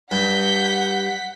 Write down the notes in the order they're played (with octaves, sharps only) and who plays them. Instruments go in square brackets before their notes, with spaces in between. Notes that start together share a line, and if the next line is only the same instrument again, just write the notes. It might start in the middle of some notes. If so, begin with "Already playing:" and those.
[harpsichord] G2 [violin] F#5 B6 [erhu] G6